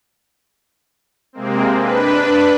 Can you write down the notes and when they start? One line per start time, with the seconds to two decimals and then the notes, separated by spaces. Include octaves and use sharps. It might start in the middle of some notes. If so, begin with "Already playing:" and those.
1.33 C3 G#3 A#3 C4
1.76 D4 B4